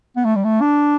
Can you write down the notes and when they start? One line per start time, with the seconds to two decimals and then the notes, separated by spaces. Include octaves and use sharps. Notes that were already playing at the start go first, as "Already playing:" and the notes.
0.16 B3
0.25 A3
0.35 G3
0.44 A3
0.61 D4